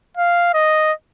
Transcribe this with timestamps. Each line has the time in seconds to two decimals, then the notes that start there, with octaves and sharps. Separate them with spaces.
0.17 F5
0.54 D#5